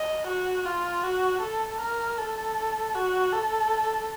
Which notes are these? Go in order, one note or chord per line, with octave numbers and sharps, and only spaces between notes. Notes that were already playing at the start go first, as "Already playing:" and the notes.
Already playing: D#5
F#4
F4
F#4
A4
A#4
A4
F#4
A4